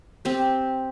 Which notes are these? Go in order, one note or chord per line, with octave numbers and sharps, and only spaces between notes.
C4 G4